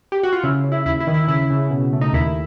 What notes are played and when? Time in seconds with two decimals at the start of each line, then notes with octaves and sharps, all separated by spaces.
0.12 G4
0.23 F#4
0.33 F4
0.43 C#3 E4
0.64 C#3
0.72 E4
0.86 D#2 E4
1.00 E4
1.07 D#3
1.14 E4
1.28 C#3 E4
1.50 C#3
1.71 B2
1.93 A3
2.01 D#4
2.13 D#2 E4